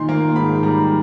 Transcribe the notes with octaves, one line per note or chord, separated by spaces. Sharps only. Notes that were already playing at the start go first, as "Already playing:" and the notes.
Already playing: A#2 D#3 C6
A#3
G#2 B5
G3 A#5